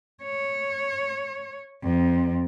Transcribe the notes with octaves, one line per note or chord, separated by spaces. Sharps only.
C#5
F2